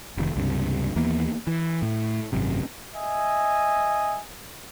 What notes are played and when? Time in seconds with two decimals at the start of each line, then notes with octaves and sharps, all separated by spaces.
0.17 F1 B2 D#3
0.36 C#2 G2 C3
0.96 D#2 E3 A#3 B3
1.47 E3
1.82 A2
2.32 G#1 F#2 C3
2.95 D#5 E5 G#5